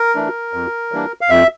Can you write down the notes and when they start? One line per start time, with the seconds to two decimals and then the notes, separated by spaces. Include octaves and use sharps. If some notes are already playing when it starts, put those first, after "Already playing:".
Already playing: A#4
0.15 E3 A3 D4
0.53 F2
0.92 E3 G3 A#3 D4
1.21 F5
1.30 F2 E5